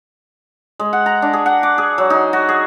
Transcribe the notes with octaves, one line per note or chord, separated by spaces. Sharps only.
G#3
F#5
A#5
D4
G#4
F#5
D6
G#4
F#3
D#4
F#4
G#4